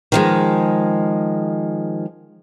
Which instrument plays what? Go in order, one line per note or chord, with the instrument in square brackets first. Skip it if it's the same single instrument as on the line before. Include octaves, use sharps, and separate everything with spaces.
[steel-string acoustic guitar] D#3 F3 G#3